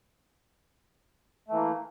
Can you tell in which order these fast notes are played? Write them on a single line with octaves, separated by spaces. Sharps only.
A3 E3 A#3